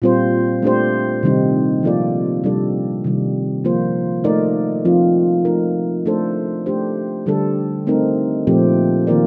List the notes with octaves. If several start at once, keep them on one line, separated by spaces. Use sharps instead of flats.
A#2 G3 C4 F4 C5
A3 D4 G4 C5
C3 D#3 G3 C4 D#4
F3 A#3 F4 A4 D5
C3 G3 D4 A4 D5
C3 D#3 G3
F3 A#3 F4 C5
A3 D#4 A#4 D5
F3 C4 F4
A3 D#4 A#4
A3 D4 A4 C5
A3 D4 G4 C5
D3 G3 D4 A4
A3 C4 D#4 A#4
A#2 F3 A3 C4 G4
D#3 A#3 F4 A#4 D5